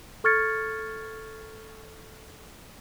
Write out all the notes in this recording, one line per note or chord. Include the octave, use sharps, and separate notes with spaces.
A4 C#6 F6 G#6 A6 C#7